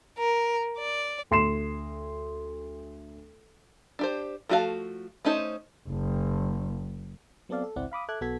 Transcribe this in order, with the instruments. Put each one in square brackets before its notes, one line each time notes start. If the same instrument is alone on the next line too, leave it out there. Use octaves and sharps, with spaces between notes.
[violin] A#4
D5
[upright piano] D2 C6 C7 E7
[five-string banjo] D4 G4 C5
F3 A3 F#4 A4 F5
A3 C#4 D#4 G#4 C5
[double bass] F#1
[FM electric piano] F#3 B3 C4 A4 D5 F5
A4
G#1 C#2 C4 E4 D5 F#5
F5 B5 D6 D#6
A4 E5 D6 F#6 G#6
B1 B3 F#4 A4 G#6 B6